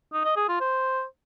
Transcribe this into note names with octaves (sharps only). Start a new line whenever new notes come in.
D#4
D#5
G#4
F4
C5